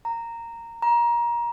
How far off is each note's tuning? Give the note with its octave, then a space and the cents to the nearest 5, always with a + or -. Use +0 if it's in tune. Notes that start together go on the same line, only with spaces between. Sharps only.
A#5 -10
A#5 +25